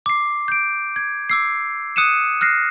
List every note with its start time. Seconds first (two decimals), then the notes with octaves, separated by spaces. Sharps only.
0.06 D6 C7
0.48 G6 D7
0.96 G#6
1.30 D6 E6 C7
1.96 D#6 F#6 C#7 D#7 E7
2.41 F6 F#6 A#6 C7